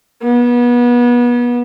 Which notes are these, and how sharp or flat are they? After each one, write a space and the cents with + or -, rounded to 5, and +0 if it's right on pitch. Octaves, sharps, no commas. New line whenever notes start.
B3 -30